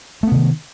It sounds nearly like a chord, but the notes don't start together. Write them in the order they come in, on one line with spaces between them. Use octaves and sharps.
A3 B3 C3 D#3